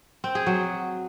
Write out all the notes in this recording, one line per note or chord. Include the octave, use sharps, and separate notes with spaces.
C4
G#4
F#3